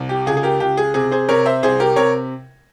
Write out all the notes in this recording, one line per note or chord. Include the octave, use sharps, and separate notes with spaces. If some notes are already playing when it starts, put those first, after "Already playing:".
Already playing: C2
G4
C#2 G#4
G#4
G4 A#4
C#2 G4
G#4
C3 G#4
G#4 C5
C3 A#4 C#5
C5 E5
C2 G#4 C5
G4 A#4
C3 A#4 C#5